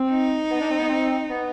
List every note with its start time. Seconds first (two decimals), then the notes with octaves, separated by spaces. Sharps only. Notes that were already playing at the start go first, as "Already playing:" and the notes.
Already playing: C4
0.11 D#4
0.51 B3
0.61 D4
0.69 C4
0.79 B3
0.89 C4
1.29 B3